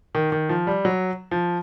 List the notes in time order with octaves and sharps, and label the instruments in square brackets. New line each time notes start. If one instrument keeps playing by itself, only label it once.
[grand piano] D#3
D#3
F3
G3
F#3
F3